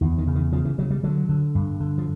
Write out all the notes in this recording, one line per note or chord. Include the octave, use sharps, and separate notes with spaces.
E2 D#3
D#3
C#3
D#3
C#3 F3
E3
C#3 F#3
G3
D3 F#3
D3
G2
D3
F3